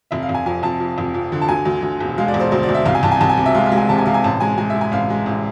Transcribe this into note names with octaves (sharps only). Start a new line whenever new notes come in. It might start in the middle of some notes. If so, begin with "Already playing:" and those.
F1 E5
F5
F1
G#5
F2 G#5
F1 A5
F2
F1
F2
D3
A5
D2 G#5
D2
D2
E1
G#3 F5
D5
E1
C5
D2 C5
D5
D2
E5
C2 F5
G#5
C2 A5
G#5
C2 A5
G#5
C3
E5
G#3 F5
F5
G#3
G#5
C3 A5
G#5
C3 F5
G#5
A1 A5
G#3 G#5
G#3 G#5
E5
G#3
G#5
A1 F5
G#3
A1